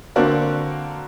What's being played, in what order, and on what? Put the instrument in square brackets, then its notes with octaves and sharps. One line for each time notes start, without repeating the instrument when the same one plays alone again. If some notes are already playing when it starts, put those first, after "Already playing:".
[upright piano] D3 A#3 C4 D4 F#4 A#4